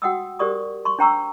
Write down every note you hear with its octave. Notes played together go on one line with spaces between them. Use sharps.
F#4 F#5 G5 D#6 E6
G4 A#4 C5 D5 C#6 D#6
C6 C#6
D4 C5 G5 A#5 C#6 E6